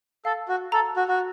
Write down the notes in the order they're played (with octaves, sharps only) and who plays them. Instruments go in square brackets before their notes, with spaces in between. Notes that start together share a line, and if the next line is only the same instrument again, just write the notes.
[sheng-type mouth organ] A4 [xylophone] F5
[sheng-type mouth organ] F#4
[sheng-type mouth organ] A4 [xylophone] A#5
[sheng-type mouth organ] F#4
F#4